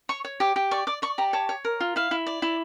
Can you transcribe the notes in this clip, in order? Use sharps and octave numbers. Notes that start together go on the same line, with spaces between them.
C#5 C#6
C#5
G4 D6
G4
D5 C#6
D5 D6
D5 C#6
G4 A#5
C#5 A5
C#5
A#4
F4
E4 F5
E4
D5
E4